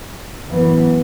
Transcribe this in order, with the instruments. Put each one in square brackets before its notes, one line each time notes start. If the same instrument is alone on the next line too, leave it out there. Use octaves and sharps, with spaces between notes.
[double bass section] F#2 E3 B3